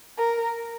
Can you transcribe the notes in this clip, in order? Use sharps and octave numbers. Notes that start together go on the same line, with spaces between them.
A#4